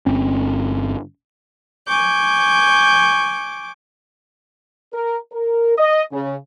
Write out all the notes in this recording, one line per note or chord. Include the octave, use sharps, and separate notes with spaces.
G1 C4 C#4
G#5 C#6 D6 G6
A#4
A#4
D#5
C#3